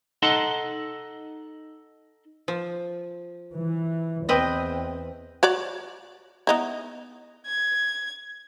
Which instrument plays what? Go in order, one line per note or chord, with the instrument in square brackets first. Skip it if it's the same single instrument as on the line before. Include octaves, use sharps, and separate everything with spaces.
[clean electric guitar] D#4 A4 D#5 F#5 A5 C6
[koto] F3
[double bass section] E3
[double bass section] E2 [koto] C4 B4 D#5
[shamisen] F#4 C#5 D5
B3 D#4 E4
[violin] G#6